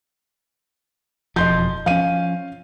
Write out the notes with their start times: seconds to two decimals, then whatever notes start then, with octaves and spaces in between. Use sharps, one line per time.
1.36 E1 F2 F3 D#5 C6 G6
1.86 F3 C#4 F5 D#7